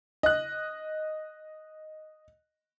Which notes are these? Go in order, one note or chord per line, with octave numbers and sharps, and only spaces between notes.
D#5 F#6